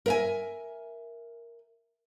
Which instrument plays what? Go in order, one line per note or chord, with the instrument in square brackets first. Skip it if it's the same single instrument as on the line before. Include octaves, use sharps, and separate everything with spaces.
[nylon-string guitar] A#4 E5 G#5